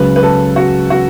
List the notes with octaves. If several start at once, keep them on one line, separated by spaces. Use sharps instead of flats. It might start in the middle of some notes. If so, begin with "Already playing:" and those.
Already playing: C#2 C#3 F#3 B4
B4
A4
F#4
F#4